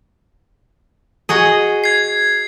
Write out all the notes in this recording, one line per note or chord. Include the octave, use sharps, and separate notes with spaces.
F#4 G#4 D#5
G#6 C7